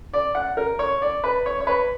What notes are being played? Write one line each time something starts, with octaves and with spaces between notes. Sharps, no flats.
D5
F#5
A#4
C#5
D5
B4
C#5
C#5
B4